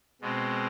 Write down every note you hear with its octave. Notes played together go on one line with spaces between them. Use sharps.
B2 G#3 C4